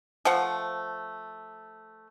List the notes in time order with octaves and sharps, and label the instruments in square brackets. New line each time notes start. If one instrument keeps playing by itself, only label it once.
[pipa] F3 A3 C5 F#5